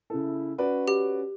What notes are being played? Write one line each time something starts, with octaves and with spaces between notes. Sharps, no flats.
C#3 E4 A4
C#4 F#4 B4 D5
G4